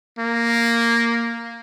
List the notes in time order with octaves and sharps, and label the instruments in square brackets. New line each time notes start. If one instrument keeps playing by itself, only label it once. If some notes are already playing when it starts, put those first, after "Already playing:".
[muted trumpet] A#3